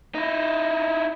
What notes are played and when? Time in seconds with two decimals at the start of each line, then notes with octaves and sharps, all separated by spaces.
0.15 D#4 E4